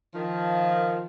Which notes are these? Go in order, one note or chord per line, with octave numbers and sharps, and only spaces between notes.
D#3 F3